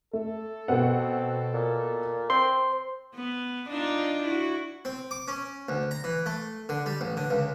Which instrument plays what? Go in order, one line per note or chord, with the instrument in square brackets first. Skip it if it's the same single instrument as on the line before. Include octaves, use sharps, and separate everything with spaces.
[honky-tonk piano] A3 [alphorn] A4
[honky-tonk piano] B2 B3 F#5 [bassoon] C4
[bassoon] A#2
[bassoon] C4 [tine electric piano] C5 C6
[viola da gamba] B3
D4 D#4 F4
E4 F#4
[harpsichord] C4
D6
C#4
D2
A#5
E3
A3
D3
G3
A1
D3
C#2